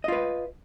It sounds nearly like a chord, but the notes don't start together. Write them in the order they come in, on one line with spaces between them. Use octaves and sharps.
D#5 F4 B4